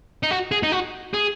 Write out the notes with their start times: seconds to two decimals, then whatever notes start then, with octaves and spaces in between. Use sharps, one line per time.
0.23 D#4
0.31 F#4
0.52 G#4
0.63 D#4
0.72 F#4
1.14 G#4